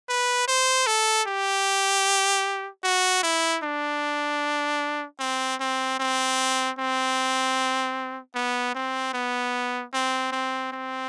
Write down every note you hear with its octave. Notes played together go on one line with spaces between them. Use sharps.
B4
C5
A4
G4
F#4
E4
D4
C4
C4
C4
C4
B3
C4
B3
C4
C4
C4